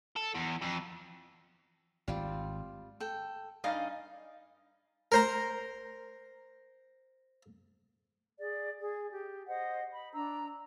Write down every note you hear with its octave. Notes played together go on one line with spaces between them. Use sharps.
A4
E2
F2
G#1 G3 C4 F4
A4 G5
G2 D#4 D5 D#5 F5 G#5
A#4 C5 A#5
G#4 D5
G#4
G4
C5 D#5 F#5
B5
D4 A#5 E6